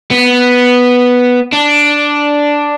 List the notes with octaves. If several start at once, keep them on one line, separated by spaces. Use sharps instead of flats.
B3
D4